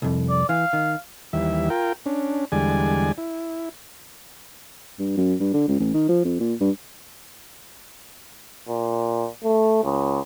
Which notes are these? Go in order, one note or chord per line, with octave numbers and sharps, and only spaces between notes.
C2 F2
D5
E3 F5
D#3
D#2 E3 G3 E5
F4 A#4 G5
C#4 D4
E2 D3 G3 G#3 D5 G#5
E4
G2
F#2
G2
D3
C#2
A1
D#3
F3
F2
A#2
G2
A#2
A3
C#2